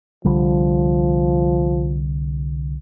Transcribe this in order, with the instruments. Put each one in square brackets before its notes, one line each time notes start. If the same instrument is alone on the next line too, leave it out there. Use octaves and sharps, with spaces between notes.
[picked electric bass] C2 D3 G3 [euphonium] F3